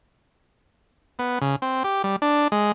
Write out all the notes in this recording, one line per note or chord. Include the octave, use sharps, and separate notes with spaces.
B3
C#3
C4
G4
G3
D4
G#3